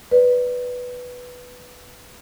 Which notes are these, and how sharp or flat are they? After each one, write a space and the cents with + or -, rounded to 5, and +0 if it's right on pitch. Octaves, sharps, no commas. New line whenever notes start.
B4 +0 D5 +0